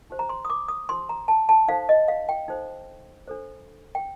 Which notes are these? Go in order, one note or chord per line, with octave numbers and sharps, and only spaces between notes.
D#4 G4 C5
A#5
C6
D#6
D6
D#6
D#4 G4 C5 C6
A#5
A5
A5
D#4 A4 C5 F5
D#5
F5
G5
D#4 A4 C5
D4 A4 C5
G5